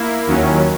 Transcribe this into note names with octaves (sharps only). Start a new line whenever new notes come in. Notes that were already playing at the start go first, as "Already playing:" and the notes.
Already playing: A#3 E4
D#2 D#3 F#3 C#4